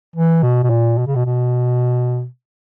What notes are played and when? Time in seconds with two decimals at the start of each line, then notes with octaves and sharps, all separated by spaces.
0.16 E3
0.43 B2
0.64 B2
0.70 A#2
0.98 B2
1.07 C#3
1.16 B2
1.26 B2